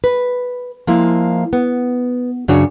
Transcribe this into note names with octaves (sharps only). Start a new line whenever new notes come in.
B4
F3 G#3 A#3 E4
B3
F#2 C#3 D4 F#4 C#5